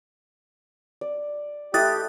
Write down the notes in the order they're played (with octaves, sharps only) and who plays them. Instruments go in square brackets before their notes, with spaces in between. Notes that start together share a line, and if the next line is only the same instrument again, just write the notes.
[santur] D5
[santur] A3 [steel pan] E4 D#5 [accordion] G4 [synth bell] D#6 F#6 A6